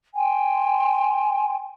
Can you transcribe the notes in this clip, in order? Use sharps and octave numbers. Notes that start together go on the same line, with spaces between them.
G5 G#5 C6